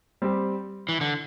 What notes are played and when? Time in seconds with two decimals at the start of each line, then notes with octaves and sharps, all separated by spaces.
0.22 G3 C4 G4
0.89 E3
1.01 D3